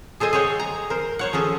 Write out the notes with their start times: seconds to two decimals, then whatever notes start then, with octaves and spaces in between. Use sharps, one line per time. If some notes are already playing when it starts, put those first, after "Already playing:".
0.20 G#4 A4 C5 D#5 G#5
0.33 G#4 C5 C#5 F#5 G5
0.60 A#5
0.90 A#4 C5
1.19 C5 C#5 F#5
1.33 F3 C#4 G#4 A4